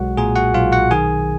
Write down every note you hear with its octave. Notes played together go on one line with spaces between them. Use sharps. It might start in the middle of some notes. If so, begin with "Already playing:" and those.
Already playing: B1 G#3 F#4 F#5
A#2 G#4 G#5
F#4 F#5
B1 F4 F5
F#4 F#5
D#3 G#4 G#5